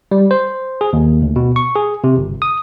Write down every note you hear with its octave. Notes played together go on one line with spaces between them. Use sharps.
G3
C5
G#4
D#2
D2
B2
C#6
G#4
C3
G1
D#6